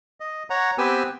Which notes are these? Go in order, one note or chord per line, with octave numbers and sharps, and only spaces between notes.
D#5
C#5 F#5 A#5
B3 C4 G4 B4 G#5 E6